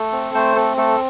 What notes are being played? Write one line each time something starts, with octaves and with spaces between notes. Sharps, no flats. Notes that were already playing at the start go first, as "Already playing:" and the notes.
Already playing: A3 A4
C4
A3 C5
C4 A4
A3 A4